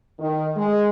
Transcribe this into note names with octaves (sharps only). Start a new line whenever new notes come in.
D#3
G#3